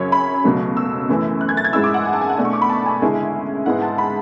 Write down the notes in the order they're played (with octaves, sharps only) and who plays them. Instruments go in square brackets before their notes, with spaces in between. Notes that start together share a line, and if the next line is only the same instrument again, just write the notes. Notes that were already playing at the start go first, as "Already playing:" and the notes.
Already playing: [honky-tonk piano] F#2 C#3 F#3 C#4 C#5
B5
C#2 B2 F#3 A3
E6
F#2 E3 A3 C#4 E4
F#6
G#6
A6
G#6
G#2 G#3 C#4 E4 E6
D6
F#5
G#5
A5
G#5
F#5
B2 A3 D4 E5
C#6
D6
B5
A5
G#5
D2 C#3 G#3 C#4 E4
G#2 G#3 B3 E4 F#5
A5
B5